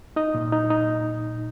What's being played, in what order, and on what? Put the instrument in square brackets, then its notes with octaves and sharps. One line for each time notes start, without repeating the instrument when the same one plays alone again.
[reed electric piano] D#4 D#5
A#2
D#4
D#4